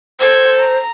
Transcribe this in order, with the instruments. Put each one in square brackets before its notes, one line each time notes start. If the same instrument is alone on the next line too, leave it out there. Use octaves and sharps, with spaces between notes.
[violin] A4 G#6 [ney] C5
[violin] A#5